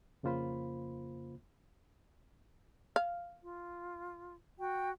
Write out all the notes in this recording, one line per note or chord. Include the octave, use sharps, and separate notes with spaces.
F2 C#3 A#3 F4 C5 B5
F5
F4
F#4 G5